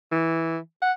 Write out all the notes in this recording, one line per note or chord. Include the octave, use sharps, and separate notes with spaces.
E3
F#5